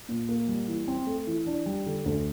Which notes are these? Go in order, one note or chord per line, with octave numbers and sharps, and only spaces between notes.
A#2
A#3
G3
E3
C4
A3
E3
D4
G3
D3
D2